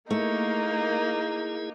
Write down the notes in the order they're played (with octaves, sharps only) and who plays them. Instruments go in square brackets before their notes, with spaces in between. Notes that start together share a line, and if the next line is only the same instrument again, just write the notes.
[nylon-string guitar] A3 [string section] A#3 [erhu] D#4 [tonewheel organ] E4 G#4